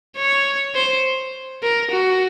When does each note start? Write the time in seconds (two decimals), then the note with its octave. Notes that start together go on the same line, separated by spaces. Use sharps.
0.17 C#5
0.75 C5
1.63 A#4
1.91 F#4